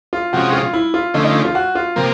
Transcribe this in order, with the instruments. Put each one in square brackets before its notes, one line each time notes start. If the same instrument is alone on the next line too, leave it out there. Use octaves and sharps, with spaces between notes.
[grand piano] F4
[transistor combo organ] C3 F3 G#3 C#4 [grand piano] F#4
[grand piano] F4
E4
F4
[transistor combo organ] D3 F3 A3 C#4 [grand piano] D#4
[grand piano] D#4
F4
F#4
F4
[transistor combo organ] C3 F3 A#3